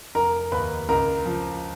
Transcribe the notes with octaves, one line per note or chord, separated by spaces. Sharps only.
F1 A#4 A#5
D#2 B4 B5
C#2 A#4 A#5
F3